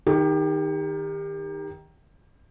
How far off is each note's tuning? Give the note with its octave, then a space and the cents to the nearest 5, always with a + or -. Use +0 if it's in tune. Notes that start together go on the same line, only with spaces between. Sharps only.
D#3 +0 G4 +30